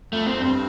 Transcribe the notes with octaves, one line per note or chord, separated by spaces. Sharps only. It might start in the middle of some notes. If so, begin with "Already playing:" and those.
F2 A3
C4
G2